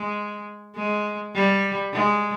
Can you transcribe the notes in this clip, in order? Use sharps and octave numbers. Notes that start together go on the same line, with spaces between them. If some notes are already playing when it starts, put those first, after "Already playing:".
Already playing: G#3
G#3
G3
G#3